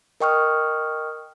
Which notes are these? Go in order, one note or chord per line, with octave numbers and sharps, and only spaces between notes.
A#4 D#5 G5 C#6 D#6 F6